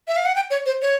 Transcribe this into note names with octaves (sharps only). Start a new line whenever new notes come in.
E5
F5
F#5
G5
C#5
C5
C#5